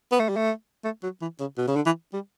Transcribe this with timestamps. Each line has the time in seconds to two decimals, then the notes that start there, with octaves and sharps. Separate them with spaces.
0.11 B3
0.20 A3
0.29 G3
0.36 A3
0.84 A3
1.03 F#3
1.21 E3
1.40 C#3
1.58 B2
1.68 C#3
1.76 D3
1.86 E3
2.13 G3